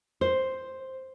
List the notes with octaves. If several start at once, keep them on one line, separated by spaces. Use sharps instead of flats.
C5